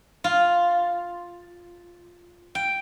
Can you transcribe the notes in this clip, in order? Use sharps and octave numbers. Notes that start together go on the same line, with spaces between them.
F4
G5